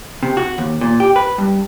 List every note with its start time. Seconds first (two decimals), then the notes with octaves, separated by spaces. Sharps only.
0.23 C3
0.37 F#4
0.58 D#2
0.81 A#2
1.00 G4
1.16 B4
1.38 G2